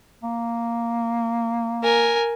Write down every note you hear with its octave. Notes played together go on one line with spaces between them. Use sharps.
A#3
A#4 G#5